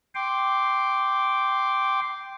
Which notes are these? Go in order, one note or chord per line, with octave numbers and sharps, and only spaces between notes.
G5 C6 D6